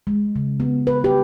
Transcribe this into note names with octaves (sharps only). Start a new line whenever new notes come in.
G#3
C#3
B3
B4
G4